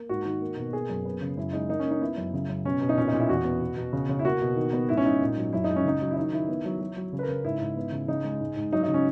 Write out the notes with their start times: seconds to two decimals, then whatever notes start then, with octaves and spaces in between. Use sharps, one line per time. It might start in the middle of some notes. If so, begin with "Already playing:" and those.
Already playing: A#3
0.09 G#2 F#4
0.25 D#3
0.41 A#3
0.57 B2
0.73 A#3 G#4
0.89 F#2
1.05 B3
1.22 C#3
1.37 F#2 E4
1.53 G#3 D#4
1.69 A#3 D#4
1.80 C#4
1.85 A#3
1.91 D#4
2.01 B3 E4
2.17 F#2
2.34 C#3
2.49 F#2
2.65 B2 C#4
2.81 B2
2.89 D#4
2.98 A#2 C#4
3.08 D#4
3.13 A#2
3.18 E4
3.29 E2 F#4
3.45 B3
3.61 B2
3.77 B2
3.93 C#3
4.09 C#3
4.19 E4
4.25 A#3 F#4
4.41 B2
4.57 D#3
4.73 B3
4.89 G#2 E4
4.97 C#4
5.05 G#2 D#4
5.21 A#2
5.37 F#3
5.53 F#2 E4
5.64 G#3 D#4
5.76 C#4
5.85 C#3 D#4
6.01 F#3
6.11 E4
6.17 D#3 D#4
6.33 D#3 E4
6.49 B3
6.65 F#3
6.80 F#3
6.97 F#3
7.13 C#3
7.19 B4
7.23 A#4
7.29 C#3
7.44 G#2 E4
7.60 G#2
7.76 B3
7.92 C#3
8.08 C#3 D#4
8.24 G#3
8.40 G#2
8.56 G#2
8.73 F#3 D#4
8.83 D#4
8.88 C#3
8.94 C#4